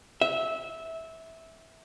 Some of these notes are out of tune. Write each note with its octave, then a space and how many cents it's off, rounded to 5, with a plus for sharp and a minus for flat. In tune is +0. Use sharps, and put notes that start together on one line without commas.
E5 -15